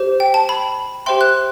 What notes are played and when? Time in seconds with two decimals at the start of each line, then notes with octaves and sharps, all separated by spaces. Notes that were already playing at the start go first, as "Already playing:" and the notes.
Already playing: G4 C5
0.20 G5
0.34 A5
0.49 B5
1.06 G4 C5 E5 G5 C6
1.21 F#6